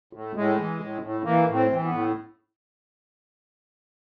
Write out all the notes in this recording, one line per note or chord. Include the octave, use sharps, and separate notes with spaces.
A2
A2 G#3
E3
A2
A2
E3 A#3
A2
C4
E3
B3
A2